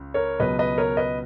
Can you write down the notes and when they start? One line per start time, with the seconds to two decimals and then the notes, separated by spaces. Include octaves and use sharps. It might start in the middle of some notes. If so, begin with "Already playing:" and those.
Already playing: C#2 C#3
0.14 A#4 C#5
0.40 C#2 B2 F#3 B4 D#5
0.59 B4 D#5
0.78 A#4 C#5
0.97 B4 D#5